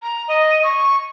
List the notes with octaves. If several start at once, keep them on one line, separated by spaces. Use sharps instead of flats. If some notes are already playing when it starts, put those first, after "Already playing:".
A#5
D#5
C#6